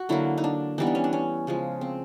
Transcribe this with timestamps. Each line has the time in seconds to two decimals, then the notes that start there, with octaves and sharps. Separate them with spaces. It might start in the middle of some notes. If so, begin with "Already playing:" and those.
Already playing: F#4
0.09 D3 F#3 A#3 E4
0.38 D#4
0.44 D4
0.78 E3 G3 B3 D#4
0.87 D4
0.95 C#4
1.04 D4
1.13 C#4
1.47 C#3 F3 G#3
1.81 C4